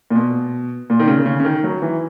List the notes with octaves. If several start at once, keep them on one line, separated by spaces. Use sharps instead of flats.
A#2
B2
A#2
D#3
C#3
C#3
C#3
D#3
F#3
E3